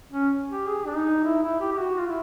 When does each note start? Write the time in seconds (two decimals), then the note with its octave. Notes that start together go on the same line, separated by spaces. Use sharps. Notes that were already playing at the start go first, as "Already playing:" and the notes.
0.12 C#4
0.50 G4
0.67 G#4
0.86 D4
0.96 D#4
1.24 E4
1.43 E4
1.61 G4
1.72 G4
1.79 F#4
1.99 F4
2.07 E4